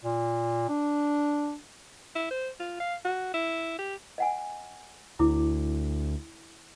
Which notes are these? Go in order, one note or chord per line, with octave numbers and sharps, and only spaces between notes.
A#2
D4
E4
C5
F4
F5
F#4
E4
G4
D#5 F#5 G#5
D2 E4 D6